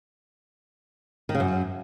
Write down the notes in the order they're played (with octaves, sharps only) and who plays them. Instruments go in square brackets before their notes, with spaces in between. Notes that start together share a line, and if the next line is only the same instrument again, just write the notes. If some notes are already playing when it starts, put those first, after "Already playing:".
[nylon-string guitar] D#3
C#3
F#2